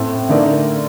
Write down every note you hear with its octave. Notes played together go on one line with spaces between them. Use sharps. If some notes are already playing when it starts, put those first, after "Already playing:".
Already playing: A2 A3 C4
D3 A3 D#4 A#4 D5